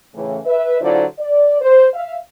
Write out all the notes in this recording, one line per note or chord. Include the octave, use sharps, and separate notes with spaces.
A2 C#3 E3
B4 E5
D3 F#3 E4 F4 C5 D5
D5
C5
E5 F5